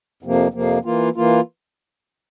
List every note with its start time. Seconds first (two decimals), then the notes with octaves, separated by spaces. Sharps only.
0.23 F2 C3 F3 A#3
0.53 F2 C3 F3 A#3
0.85 E3 A#3 F4
1.16 E3 A#3 F4